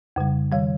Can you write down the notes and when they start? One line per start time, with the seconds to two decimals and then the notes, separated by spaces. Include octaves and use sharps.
0.16 F2 C#3 G3
0.52 D#3 G3 F5